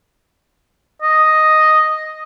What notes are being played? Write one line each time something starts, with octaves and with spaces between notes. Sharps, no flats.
D#5